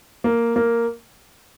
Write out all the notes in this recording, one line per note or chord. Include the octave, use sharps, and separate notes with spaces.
A#3
A#3